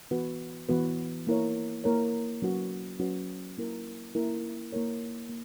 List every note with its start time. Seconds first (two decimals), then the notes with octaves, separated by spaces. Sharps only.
0.11 E3 B3 F#4 B4
0.69 E3 B3 F#4 B4
1.27 A#3 E4 A#4 C#5
1.84 A#3 E4 A#4 C#5
2.42 F#3 C#4 F#4 B4
2.99 F#3 C#4 F#4 B4
3.58 A#3 C#4 E4 A#4
4.15 A#3 C#4 E4 A#4
4.72 A#3 E4 A#4 C#5
5.29 A#3